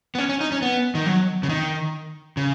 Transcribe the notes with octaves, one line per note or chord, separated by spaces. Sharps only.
B3
C#4
C#4
D#4
C#4
B3
D#3
F#3
C#3
D#3
C#3